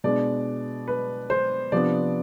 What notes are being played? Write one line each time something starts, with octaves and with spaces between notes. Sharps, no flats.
B2 G#3 D4 D5
B4
C5
C3 F3 B3 D4 D5